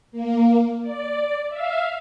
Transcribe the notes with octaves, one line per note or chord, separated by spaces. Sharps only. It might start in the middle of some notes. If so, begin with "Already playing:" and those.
A#3
D5
E5 F5